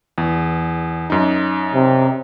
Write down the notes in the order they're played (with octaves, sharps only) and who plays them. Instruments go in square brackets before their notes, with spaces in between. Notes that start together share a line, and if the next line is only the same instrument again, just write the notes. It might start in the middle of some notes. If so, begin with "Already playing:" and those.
[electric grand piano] E2
F#2 D#4
[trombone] C3